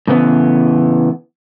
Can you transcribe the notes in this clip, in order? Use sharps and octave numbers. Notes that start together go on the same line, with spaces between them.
A2 C#3 E3 B3